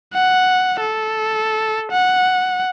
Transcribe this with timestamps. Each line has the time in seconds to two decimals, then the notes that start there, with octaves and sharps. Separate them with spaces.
0.14 F#5
0.81 A4
1.92 F#5